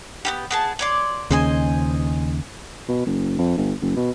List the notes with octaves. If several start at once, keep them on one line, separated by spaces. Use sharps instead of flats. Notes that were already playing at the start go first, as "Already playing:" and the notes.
B3 E4 G4
B3 G#4 A5
C#5 D5 C6
D#2 C#3 C5 D#5 G#5
B2
F#1
F2
G1
F#1
B2